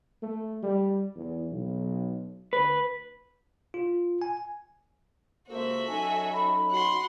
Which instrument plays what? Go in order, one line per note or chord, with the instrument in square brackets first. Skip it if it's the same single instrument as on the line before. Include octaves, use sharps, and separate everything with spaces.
[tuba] A3
G3
E2
B1
[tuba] D2 [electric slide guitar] B4
[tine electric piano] F4
G#5
[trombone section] C#2 A#3 C5 [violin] F#4 E5 [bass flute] A4
[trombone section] F#3 C#4 D#4 [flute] G#5
[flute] B5
[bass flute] F#4 [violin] F#5 C6